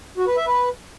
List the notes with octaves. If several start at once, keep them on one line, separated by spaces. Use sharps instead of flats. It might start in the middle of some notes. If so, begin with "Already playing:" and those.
F#4
B4
E5
B4